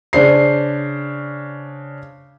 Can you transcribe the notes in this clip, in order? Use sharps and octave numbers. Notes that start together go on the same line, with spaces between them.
C#3 D4 C5 C7